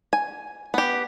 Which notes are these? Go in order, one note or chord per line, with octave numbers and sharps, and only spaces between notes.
G#5
B3 G4